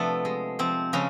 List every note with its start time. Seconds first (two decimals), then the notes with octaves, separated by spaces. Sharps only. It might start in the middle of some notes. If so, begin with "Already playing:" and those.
Already playing: C3 F3 A3 B3 D4 A4 B4
0.25 G#3
0.59 F3 C4
0.93 C#3 F3 C#4